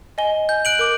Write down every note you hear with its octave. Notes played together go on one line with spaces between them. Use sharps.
D#5 G#5 G7
G#5 G6
F#6 D7 F#7
A#4 D6